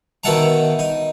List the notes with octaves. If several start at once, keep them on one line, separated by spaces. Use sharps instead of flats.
B2 D#3 E5 F#5 A5 A#5
D#4